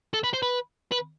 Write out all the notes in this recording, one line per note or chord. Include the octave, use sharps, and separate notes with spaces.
A4
B4
C5
B4
B4